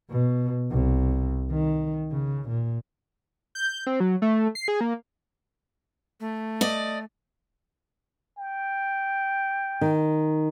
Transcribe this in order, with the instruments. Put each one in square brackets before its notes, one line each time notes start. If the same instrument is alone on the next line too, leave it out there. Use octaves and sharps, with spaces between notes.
[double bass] B2
C2
D#3
C#3
A#2
[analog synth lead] G6
C4
F#3
A3
C7
G#4
A#3
[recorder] A3
[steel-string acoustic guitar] D5 D#5
[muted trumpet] G5
[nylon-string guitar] D#3